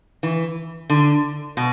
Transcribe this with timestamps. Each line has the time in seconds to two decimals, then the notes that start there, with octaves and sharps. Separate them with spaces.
0.23 E3
0.90 D3
1.57 B2